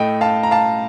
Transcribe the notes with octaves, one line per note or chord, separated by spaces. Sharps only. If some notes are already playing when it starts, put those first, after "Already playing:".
Already playing: A2 A3 D#5 G5
F5 A5
A#5
F5 A5